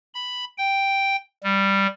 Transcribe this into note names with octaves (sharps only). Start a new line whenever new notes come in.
B5
G5
G3